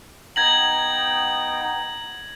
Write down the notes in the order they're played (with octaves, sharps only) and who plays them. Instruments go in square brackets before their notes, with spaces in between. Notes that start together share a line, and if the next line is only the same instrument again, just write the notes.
[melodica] B3 D#4 G5 [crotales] G#6 A#6 F#7